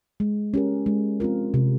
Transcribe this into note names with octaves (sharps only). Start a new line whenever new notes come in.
G#3
C#4 G4 A#4
G#3
C4 F4 A#4
C3